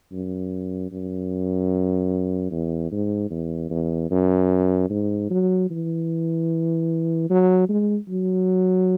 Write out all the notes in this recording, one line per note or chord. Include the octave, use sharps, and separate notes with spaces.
F#2
F#2
E2
G#2
E2
E2
F#2
G#2
F#3
E3
F#3
G#3
F#3